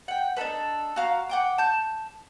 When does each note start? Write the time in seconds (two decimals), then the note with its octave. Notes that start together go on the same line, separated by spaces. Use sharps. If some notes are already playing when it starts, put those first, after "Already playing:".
0.08 F#5 G5
0.37 D4 D#4 A4 B4
0.96 F#4 F5 A#5
1.29 F#5 G5 D6
1.58 A5 G6